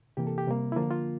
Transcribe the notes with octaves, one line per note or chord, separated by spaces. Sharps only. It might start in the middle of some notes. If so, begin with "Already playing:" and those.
C3 E3 A#3 G4
A4
G4
C3 G3 A#3
E4
D3 F3 A#3 F4
F4